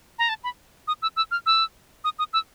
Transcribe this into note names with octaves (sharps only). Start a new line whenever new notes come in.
A#5
A5
B5
D#6
E6
E6
F6
E6
D#6
D#6
E6